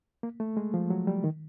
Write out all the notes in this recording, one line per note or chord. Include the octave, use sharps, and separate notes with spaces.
A#3
A3
G#3
F3
F#3
G3
D#3